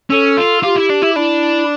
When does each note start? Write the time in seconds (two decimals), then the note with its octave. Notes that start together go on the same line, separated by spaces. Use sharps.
0.10 C#4 A4
0.38 F4
0.63 F4 G4
0.76 E4
0.90 D4
1.02 E4
1.16 D4 E4